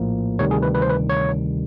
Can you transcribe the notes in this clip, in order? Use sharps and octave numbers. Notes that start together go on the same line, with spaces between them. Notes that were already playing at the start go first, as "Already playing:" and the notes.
Already playing: A#1 A2 F3 A#3
D2 C3 D#3 G3 C#5
G#4
B4
B4
C5
B4
C#5